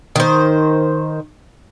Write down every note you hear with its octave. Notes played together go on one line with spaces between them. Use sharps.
D#3 C5